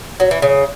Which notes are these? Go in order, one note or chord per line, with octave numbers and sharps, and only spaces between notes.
F#3
E3
C#3